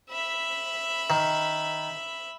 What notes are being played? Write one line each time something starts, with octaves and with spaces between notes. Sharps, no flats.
E5 B5
D#3